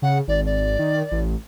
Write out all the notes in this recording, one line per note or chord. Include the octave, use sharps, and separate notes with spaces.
C#3 F#5
G#1 D5
D5
D#3
A1